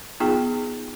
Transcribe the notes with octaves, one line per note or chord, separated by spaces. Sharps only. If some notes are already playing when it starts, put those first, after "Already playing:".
B3 D#4 F4 G#4 G5